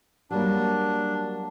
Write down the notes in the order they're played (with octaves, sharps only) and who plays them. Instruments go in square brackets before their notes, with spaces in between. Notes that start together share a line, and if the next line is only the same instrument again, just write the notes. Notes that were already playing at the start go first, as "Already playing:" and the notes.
[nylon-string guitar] F#3 G3 A#3 [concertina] D4